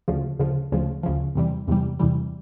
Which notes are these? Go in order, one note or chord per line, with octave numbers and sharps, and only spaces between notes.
D2 C#3 F3
D2 C#3 F3
D2 C#3 F3
D2 C#3 F3
E2 C3 E3 G3
E2 C3 E3 G3
E2 C3 E3 G3